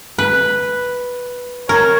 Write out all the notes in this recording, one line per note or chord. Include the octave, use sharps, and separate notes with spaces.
B4
A#4 C#5